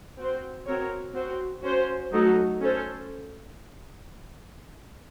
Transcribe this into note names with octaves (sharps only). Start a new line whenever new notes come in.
C4 F#4 C5
C4 F#4 A#4 C#5
C4 F#4 C5
C#4 F#4 C5
F#3 A3 D#4 F#4 A4
C#4 A4 C5